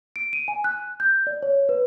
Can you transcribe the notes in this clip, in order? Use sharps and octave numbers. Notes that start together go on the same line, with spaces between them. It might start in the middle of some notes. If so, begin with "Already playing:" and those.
D7
D#7
G#5
F#6
G6
D5
C#5
B4